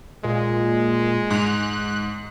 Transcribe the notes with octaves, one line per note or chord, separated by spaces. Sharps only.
A#2 G#3
G#2 F#6 F7